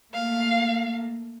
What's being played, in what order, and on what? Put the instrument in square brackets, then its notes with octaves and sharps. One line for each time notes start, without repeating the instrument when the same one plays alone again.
[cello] A3 A#3 [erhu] F5